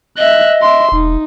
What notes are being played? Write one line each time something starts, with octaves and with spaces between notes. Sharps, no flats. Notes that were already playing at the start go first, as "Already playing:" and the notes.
D#5 E5 F#6
E5 C6
E1 D#4